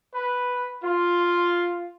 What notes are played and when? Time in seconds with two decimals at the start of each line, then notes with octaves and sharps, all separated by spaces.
0.14 B4
0.83 F4